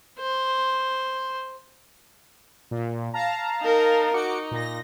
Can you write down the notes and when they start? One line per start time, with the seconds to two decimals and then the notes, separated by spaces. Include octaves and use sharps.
0.19 C5
2.71 A#2
3.14 F5 A5 A#5
3.62 D#4 A#4
4.14 D#4 F#4 D6 C#7
4.51 A#2 A#6